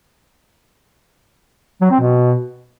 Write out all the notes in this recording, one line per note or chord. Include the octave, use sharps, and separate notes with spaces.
F#3
C4
B2